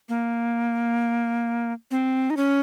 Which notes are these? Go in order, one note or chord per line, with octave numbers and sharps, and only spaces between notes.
A#3
C4
D#4
C#4